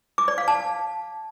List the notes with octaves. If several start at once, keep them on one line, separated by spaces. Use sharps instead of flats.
D6
D5
F5
A5